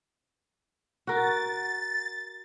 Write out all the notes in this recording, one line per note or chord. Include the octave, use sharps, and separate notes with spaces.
F#4 A#4 A6